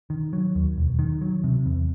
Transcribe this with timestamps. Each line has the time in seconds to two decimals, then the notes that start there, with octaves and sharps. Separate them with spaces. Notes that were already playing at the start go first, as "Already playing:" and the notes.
0.10 D#3
0.33 F#3
0.55 D#2
0.78 E1
0.99 D#3
1.21 F#3
1.44 C3
1.66 E2